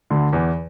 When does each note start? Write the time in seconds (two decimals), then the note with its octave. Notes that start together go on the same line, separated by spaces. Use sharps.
0.10 D2 D3
0.33 E2 E3